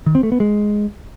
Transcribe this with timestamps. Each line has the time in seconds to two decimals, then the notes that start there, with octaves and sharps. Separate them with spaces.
0.06 D#3
0.15 C4
0.23 A3
0.32 B3
0.40 G#3